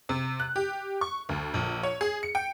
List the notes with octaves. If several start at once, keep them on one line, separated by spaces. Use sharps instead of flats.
C3
F#6
G4
C#6
D2
A#1
C#5
G#4
C#7
G5